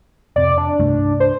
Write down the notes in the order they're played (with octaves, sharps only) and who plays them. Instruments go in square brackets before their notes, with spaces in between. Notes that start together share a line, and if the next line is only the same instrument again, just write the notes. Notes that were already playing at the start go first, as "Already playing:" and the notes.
[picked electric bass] F1 C3 [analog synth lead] D5
[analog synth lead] D4
[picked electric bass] C2 G2 A3
[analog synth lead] C5